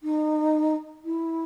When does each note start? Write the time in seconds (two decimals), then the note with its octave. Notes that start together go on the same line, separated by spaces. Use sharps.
0.03 D#4
1.05 E4